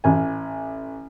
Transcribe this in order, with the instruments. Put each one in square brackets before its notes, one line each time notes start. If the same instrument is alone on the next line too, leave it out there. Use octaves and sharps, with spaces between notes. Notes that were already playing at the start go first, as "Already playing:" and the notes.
[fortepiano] A1 G#5